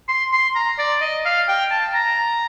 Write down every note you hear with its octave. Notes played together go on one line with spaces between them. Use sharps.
C6
C6
A#5
D5
D#5
F5
G5
A5
A#5